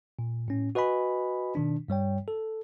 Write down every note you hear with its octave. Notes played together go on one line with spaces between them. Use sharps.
A#2
A2 C#4
F#4 B4 D#5 G#5 B5
B2 D#3 D4
G2 G3 C#5 G5
A4